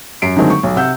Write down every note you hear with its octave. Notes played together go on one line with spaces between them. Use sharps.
F#2 C7 D7
D3 D#3 F#3 G#3 A3 C4
C#6
B1
C3 F#5 E6 G6